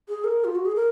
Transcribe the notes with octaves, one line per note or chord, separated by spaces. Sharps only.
G#4
A#4
F4
F#4
G#4
A#4